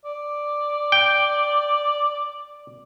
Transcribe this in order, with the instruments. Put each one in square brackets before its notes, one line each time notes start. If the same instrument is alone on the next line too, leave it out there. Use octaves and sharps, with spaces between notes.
[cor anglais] D5
[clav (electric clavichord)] G5